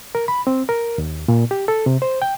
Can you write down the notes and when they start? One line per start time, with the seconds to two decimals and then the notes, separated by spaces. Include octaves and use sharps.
0.15 A#4
0.28 B5
0.47 C4
0.69 A#4
0.98 D#2
1.28 A#2
1.51 G4
1.68 A4
1.86 C3
2.02 C5
2.22 G5